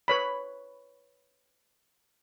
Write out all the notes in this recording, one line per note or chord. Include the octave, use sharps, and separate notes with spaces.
B4 C#5 B5